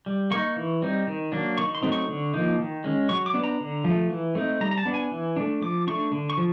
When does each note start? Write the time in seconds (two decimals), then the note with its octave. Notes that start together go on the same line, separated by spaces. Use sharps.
0.06 G3
0.31 A#3 D#4 C#6
0.56 E3
0.82 G3 C4 D#4
1.07 D#3
1.32 F#3 A#3 D4
1.57 D#3 C#6
1.75 C6
1.82 F#3 A3 C4 D#4
1.92 C#6
2.08 D3
2.34 F3 A#3 D#4
2.59 D#3
2.84 G#3 C#4
3.09 F#3 C#6
3.26 D6
3.34 B3 D4
3.43 A#5
3.60 D3
3.84 F3
3.90 A3
4.10 E3
4.35 A3 C4 D#4
4.61 G3 A#5
4.71 A#5
4.78 A5
4.85 B3 D4
4.94 G#5
5.11 E3
5.36 A3 D4
5.62 F3 D6
5.87 A3 D4 C#6
6.12 D3
6.30 C#6
6.37 F3